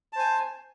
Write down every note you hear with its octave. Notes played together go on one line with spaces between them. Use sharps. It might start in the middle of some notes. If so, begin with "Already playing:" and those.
C5 G#5 A5